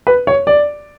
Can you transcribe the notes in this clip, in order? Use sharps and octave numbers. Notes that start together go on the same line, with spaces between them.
B4
C#5
D5